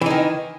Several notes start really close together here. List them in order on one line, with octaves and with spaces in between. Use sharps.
E3 D#4 D#3